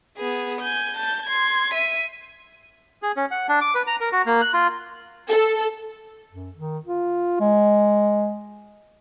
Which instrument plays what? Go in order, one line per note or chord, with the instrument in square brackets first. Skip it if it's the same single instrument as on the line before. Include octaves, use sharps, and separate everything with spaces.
[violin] B3 G#4
G#5 G6
A5 G6
C6 G#6
E5 D#7
[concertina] G#4
C#4
F#5
D4
D6
B4
A#5
A#4
F#4
A#3
F#6
F4
[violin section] A4
[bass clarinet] F#2
D#3
F4
G#3